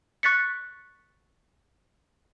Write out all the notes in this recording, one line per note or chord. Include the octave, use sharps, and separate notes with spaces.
C#6 F#6 A6 B6 C#7